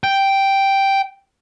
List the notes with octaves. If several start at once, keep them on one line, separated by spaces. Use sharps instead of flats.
G5